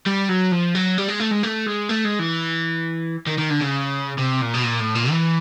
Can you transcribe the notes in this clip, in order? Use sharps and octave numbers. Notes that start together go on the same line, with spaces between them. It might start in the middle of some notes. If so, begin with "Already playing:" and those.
G3
F#3
F3
F#3
G3
G#3
A3
G#3
A3
G#3
A3
G#3
E3
D#3
D#3
D3
C#3
C3
A#2
B2
A#2
A2
A#2
E3